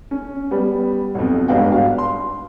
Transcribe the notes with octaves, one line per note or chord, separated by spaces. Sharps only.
C#4
G3 B3
B1 F2
G#1 G2 B3 F#4 F5 G5
F5
C6